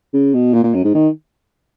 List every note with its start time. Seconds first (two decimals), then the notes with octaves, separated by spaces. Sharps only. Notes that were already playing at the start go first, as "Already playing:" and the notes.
0.13 C#3
0.34 B2
0.54 A#2
0.64 A#2
0.74 F#2
0.84 G#2
0.94 D#3